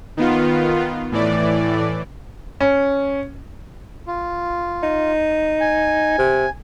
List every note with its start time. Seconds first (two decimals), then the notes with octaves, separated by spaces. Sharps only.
0.17 D#3 B3 F4
1.12 A2 E3 D5
2.61 C#4
4.07 F4
4.83 D#4
5.60 G#5
6.18 C3